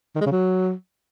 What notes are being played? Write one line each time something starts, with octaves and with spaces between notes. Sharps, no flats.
D#3
G#3
C#3
F#3